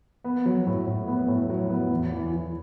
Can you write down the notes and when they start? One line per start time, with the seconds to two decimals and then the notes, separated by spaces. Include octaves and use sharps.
0.24 B3
0.46 F#3
0.67 A2
0.87 A2
1.08 B3
1.28 A2
1.50 F#3
1.69 B3
1.91 E2
2.12 E3
2.32 E3